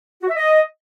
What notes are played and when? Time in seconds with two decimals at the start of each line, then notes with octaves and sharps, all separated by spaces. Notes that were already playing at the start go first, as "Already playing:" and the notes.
0.22 F#4
0.29 E5
0.36 D#5